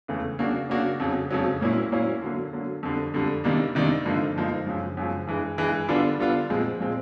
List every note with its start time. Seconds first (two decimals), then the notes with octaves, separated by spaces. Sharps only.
0.08 E2 C#3 E3 A3
0.39 C#3 F#3 A#3 D4 F#4
0.69 C#3 F#3 A#3 D4 F#4
1.00 F2 C#3 F#3
1.31 F2 C#3 F#3
1.61 A#2 F#3 A#3 C#4 E4
1.91 A#2 F#3 A#3 C#4 E4
2.22 D3 F#3 A#3
2.53 D3 F#3 A#3
2.83 F2 D3 G3
3.14 F2 D3 G3
3.44 C3 D#3 G3 A#3 D4
3.75 C3 D#3 G3 A#3 D4
4.05 G2 D3 F3 A#3 D#4
4.36 G2 D3 F3 A#3 D#4
4.66 F#2 C#3 F3
4.97 F#2 C#3 F3
5.27 G2 E3 G#3
5.58 G2 E3 G#3
5.88 D3 G3 B3 D4 F4
6.19 D3 G3 B3 D4 F4
6.50 A#2 F3 G#3 C4
6.80 A#2 F3 G#3 C4